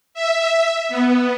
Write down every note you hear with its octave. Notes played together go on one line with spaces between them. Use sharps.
E5
B3